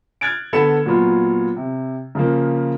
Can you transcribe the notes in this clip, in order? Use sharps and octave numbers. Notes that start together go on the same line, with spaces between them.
F6 F#6 G#6 A6 D7
D3 B3 A4 B5 C#7 E7
A#2 F#3 B3 F4
C3
C#3 F3 A#3